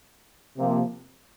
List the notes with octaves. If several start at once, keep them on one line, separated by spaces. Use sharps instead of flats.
C3 F3 A#3